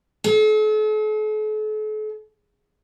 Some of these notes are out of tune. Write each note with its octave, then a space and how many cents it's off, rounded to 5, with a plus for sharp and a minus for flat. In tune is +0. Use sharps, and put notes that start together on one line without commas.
A4 -45